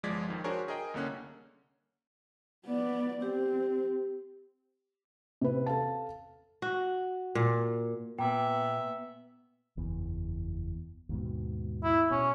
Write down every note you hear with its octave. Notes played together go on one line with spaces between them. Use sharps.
G1 F3 G#3 D5 G#6 B6
F2 D#3
D4 F#4 G#4 A#4 C5 C#5
G#4 A#4 D#5 G5
C2 D3 A#3 C#4 F#6
B3 D5
C4 G4
C3 B4
A4 F5 A5
F#4
A#2
A#2 B3 E5 G5
F#1 E2
D#2 G#2 B2
E4
B2 C#4